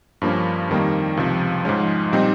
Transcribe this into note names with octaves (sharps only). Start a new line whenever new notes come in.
G2 F3 A#3 C#4
F2 D#3 G3 A#3
C#2 C3 F3
G#2 F3 G#3 C#4
A#2 G3 C4 D#4